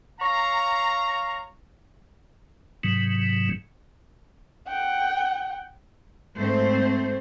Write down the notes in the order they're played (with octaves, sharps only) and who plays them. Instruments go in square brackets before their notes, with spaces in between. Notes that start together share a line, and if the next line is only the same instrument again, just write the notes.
[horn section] C#5 F5 A#5
[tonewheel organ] G#2 C3 E3 F#3
[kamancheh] F#5 G5
[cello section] G#2 A3 C4 C5